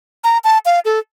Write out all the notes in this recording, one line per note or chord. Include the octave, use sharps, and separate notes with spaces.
A#5
A5
F5
A4